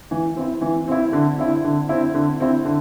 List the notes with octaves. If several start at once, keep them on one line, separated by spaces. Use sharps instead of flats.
E3
C4 E4
E3
C4 E4
D3
C4 E4
D3
C4 E4
D3
C4 E4
D3